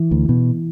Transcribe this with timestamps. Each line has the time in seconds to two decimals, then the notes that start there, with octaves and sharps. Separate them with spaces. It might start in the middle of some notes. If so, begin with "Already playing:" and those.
Already playing: E3
0.11 D2
0.29 B2